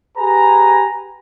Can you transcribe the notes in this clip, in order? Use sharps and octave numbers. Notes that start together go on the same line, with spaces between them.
G4 G#4 B4 G#5 A#5